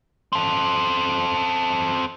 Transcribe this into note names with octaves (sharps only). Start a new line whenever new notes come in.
C4 A4